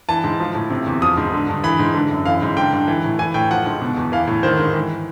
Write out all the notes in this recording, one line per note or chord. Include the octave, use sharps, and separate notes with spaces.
E3 A5
G#2
F3
A2
C3
E2
F3 D#6
G#2
D3
G2
E3 B5
G#2
D3
F#2
E3 F5
G#2
D3 G5
G2
E3
A2
E3 G#5
A2 G5
F3 F#5
G#2
B2
E2
E3 F5
A2
D#3 C5
G#2
E3